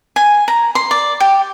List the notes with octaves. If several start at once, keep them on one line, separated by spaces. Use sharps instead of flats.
G#5
A#5
C6
D5
G4